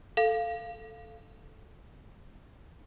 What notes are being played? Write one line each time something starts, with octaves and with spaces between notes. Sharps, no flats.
A4 F5